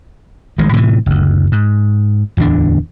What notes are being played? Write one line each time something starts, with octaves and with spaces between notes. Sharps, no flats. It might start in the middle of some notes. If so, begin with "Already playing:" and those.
A1 D#3 G#3
A2 C3 D#3 E3
F#1 D2
G#2
D1 E2 D3 D4